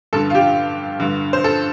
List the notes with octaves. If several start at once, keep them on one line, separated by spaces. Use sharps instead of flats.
G2 D3 A4
F4
G4
G2 D3
C5
A4